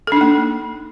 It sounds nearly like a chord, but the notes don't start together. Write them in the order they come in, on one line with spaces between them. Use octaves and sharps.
A4 D4 D#4 A#3